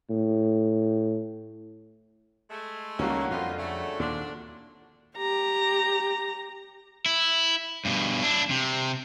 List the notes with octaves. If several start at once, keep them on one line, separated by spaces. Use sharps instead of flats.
A2
G#3 A3
C#2 D#3 F#3 G3 A#3 C#4 F#5
F2 D3 B3 C4 D#4 F4 F#4
C#3 F#3 A3
D#2 A#2 D4 C6
G4 A#5
E4
G2 B2
D4 E4
C3